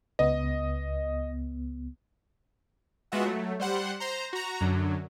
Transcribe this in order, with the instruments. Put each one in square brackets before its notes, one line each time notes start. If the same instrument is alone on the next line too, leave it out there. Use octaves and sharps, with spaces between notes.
[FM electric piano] C#2 B3 [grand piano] D#5
[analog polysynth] G#3 B3 F4 F#4 E5 F#5
F#3 A3
G3 C5 F#5
C5 A#5
F#4 A#5
F#2 D3 F#3